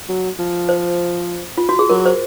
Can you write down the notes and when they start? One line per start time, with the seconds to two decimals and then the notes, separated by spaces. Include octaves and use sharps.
0.09 F#3
0.39 F3
0.69 C5
1.58 F4
1.69 F#4
1.79 G#4
1.90 F#3 A#4
2.06 C5